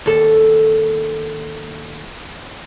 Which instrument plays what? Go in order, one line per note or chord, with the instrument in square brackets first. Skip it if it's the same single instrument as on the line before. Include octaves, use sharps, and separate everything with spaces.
[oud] D#2 A4